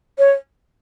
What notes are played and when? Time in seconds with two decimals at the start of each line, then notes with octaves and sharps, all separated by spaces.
0.18 C#5